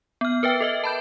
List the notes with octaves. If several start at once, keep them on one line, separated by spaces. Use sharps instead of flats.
B3 F6
A#4 B4 E5 G5
A4 D#5 E5
A5 B5 G6